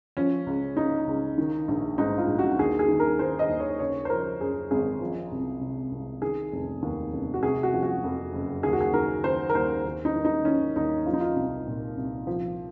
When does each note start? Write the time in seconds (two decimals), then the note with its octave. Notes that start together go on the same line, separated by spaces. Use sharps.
0.17 F3 C#4
0.46 C#2
0.77 C#3 D#4
1.07 C#2
1.38 D#3
1.68 A#1
1.98 G#2 D#4
2.18 F4
2.28 A#1
2.39 F#4
2.59 D#2 G#4
2.79 G#4
2.88 D#3
3.00 A#4
3.19 D#3 C5
3.39 D#5
3.49 D#2
3.60 C#5
3.79 C#3 C#5
4.05 C5
4.10 F3 A#4
4.41 F#2 G#4
4.71 G#1 G#4
5.01 F3
5.32 C2
5.61 C3
5.92 C2
6.22 D#3 G#4
6.53 F1
6.82 D#2
7.13 F1
7.34 F#4
7.42 C3 G#4
7.63 F#4
7.73 F3
7.83 F#4
8.04 F2
8.33 F#1
8.63 D#2 G#4
8.73 F#4
8.81 G#4
8.94 D#3 A#4
9.24 D#3 C5
9.49 A#4
9.55 D#2 C5
9.84 D#2
10.05 D#4
10.15 D#3
10.25 D#4
10.45 D#3 C#4
10.76 D#2 D#4
11.06 F3 F4
11.13 D#4
11.20 F4
11.36 C2
11.67 A#2
11.97 C2
12.27 F3